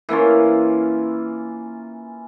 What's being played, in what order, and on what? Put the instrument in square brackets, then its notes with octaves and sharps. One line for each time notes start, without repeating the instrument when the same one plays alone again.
[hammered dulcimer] E3 A#3 C#4 F4